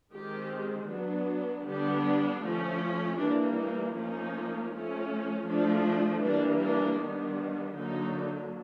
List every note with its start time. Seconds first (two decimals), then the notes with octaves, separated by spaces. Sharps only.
0.14 D#3 G#3 C4 G4
0.90 F#3 B3 D4
1.65 D3 G3 B3 D4 G4
2.42 F3 A3 C#4
3.18 E3 G3 A#3 D4
3.57 D#4
3.94 F3 A#3 C#4 D#4
4.71 F3 A3 C#4
5.47 F3 A3 D4
6.23 E3 G3 A#3 D4
6.61 D4
6.99 D#3 G3 B3 D4
7.75 D3 F#3 A#3 D4 D#4